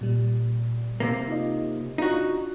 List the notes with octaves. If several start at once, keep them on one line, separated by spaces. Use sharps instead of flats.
A#2 G3
C3 A#3
D#4 F4 D#5
D4 D#4 F4 F#4